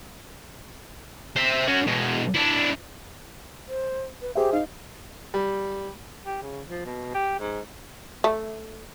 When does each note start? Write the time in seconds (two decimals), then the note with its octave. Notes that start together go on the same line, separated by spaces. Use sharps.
1.36 C5 E5
1.68 C#4 F#4
1.87 B2 G#3
2.34 D4 E4
3.68 C5
4.21 B4
4.35 G4 G#4 C5 E5
4.53 D#4 F5
5.34 G3
6.26 G4
6.42 C#3
6.68 F3
6.86 B2
7.14 G4
7.39 G#2
8.24 A3